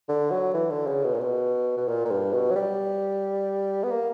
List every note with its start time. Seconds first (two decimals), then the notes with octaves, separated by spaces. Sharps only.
0.09 D3
0.30 F#3
0.54 E3
0.70 D3
0.87 C#3
1.04 B2
1.14 A#2
1.21 B2
1.77 B2
1.88 A#2
2.05 A#2
2.11 G2
2.33 B2
2.51 F#3
2.56 G3
3.83 B3
3.91 A#3